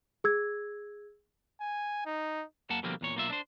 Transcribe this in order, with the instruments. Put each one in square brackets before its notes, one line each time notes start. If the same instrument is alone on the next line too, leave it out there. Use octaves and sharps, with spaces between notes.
[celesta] G#4 E6 G#6
[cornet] G#5
D#4
[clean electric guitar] F#2 A#3 F#5 A5
B2 D3 F3 G3 A#3 C4
E2 A#2 C#5
B1 A#3 F4 E5
D4 C5